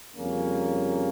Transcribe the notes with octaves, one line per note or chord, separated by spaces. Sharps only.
F2 C#3 G3 A#3 C#4